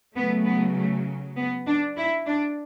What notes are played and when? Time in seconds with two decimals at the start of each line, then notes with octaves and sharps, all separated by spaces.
0.16 C#3 F#3 A3 B3
0.46 B3
0.77 A3
1.37 B3
1.67 D4
1.97 E4
2.27 D4